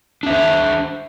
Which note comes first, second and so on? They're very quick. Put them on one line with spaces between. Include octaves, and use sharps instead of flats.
D4 E5 C5